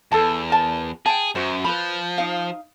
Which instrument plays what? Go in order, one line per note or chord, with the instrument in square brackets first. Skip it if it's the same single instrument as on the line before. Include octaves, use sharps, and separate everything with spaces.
[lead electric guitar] E2 [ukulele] A4 A5
[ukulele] A#4 A5
[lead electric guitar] G#4 [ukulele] G5 A5
[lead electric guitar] F#2 [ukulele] F#4 C5
[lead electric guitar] F3 [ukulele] B4 B5
[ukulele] D#4 F5